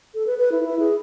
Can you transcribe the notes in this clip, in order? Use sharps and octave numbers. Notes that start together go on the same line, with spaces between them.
A4
B4
B4
E4
E4
G#4